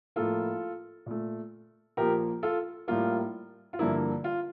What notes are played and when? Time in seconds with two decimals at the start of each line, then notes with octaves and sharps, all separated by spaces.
0.16 A2 F3 A#3 F4 A4
1.06 A#2 A3
1.97 A#2 F3 A#3 G4 A#4
2.43 F4 A4
2.88 A2 G3 A#3 F4
3.73 F4
3.79 G2 D3 F3 A#3 E4
4.24 F4